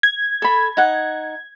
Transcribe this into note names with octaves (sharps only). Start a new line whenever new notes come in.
G#6
A4 B5
D#4 F#5